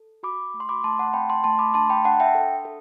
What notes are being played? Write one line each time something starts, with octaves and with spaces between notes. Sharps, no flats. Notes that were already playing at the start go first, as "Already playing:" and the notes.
Already playing: A4
F#4 B5 D6
A3
C6
B5 D6
A3 A5 C6
F#5 A5
C4 G5 B5
A5 C6
A3 A5 C6
B5 D6
D4 A5 C6
G5 B5
D4 F#5 A5
E5 G5
A4
A4